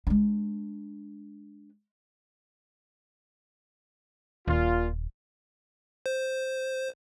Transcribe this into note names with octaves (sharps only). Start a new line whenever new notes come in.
G#3 D4
D#1 A#2 F4
C5